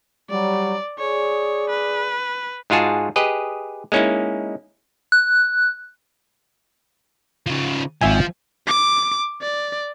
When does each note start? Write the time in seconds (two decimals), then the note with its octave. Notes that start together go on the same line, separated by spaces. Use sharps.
0.30 F#3 G3 D5
0.99 G#4 C#5 D5
1.70 B4
2.70 G#2 G#3 F4 F#4 G#4 A5
3.16 G4 G#4 B4 D#5
3.92 G#3 A#3 C#4 D#4 E4
5.12 F#6
7.47 C#3 F3
8.01 G#1 F3 E5 G#5
8.67 D6
9.41 D5